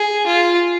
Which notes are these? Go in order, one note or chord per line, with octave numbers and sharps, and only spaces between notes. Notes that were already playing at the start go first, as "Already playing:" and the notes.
Already playing: G#4
F4